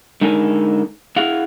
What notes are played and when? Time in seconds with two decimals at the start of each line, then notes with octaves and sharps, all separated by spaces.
0.21 D3 G#3 D#4 A4 A#4 G#5
1.16 E4 G#4 F5 F#5